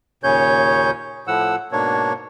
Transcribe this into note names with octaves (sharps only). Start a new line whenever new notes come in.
D#2 A#2 C#3 C#4 C#5 G6
A2 F3 F#5 E6
G#2 B2 A#3 D4 C#5